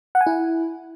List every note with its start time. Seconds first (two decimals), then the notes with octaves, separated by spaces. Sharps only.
0.15 F#5
0.21 G#5
0.27 E4